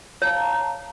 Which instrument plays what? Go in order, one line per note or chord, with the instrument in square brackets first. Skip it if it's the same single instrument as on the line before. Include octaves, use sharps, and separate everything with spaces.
[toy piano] C#5 [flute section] F5 A5 A#5